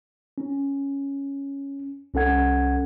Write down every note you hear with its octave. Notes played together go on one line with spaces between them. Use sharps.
C#4
C2 C#4 A4 F#5 G#6